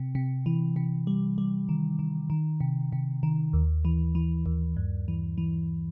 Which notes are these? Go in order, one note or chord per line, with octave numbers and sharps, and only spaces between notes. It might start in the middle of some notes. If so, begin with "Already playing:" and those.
Already playing: C3
C3
E3
C3
G3
G3
D#3
D#3
D#3
C3
C3
D#3
D#2
E3
E3
D#2
G2
E3
E3